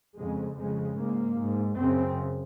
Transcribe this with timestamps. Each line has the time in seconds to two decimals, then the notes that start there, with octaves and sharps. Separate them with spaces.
0.16 F2 C#3 G#3
0.56 F2 C#3 G#3
0.95 G#2 A#3
1.37 G#2
1.76 F#2 C#3 C4